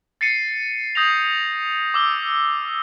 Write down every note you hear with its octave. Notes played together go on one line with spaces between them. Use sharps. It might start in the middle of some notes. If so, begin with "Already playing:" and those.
A6 C7 C#7 D#7
D#6 G6 A#6 C7 F7
D6 E6 G7